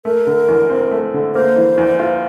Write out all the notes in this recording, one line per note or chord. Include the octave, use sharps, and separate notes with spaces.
A3 A#4
D3
E2
C4
A3
D3
A#3 C5
E3
E2
F4